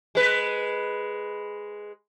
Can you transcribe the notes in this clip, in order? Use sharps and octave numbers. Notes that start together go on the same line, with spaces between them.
G#3 B4